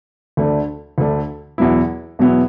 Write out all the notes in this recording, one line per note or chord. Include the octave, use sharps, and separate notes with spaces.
D2 D3 A3 D4
D2 D3 A3 D4
E2 B2 F#3 B3 E4
E2 B2 F#3 B3 E4